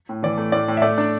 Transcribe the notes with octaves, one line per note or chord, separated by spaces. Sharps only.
A2
E3 D5
A3
A2 D5
A2
E5
A3 D5
D4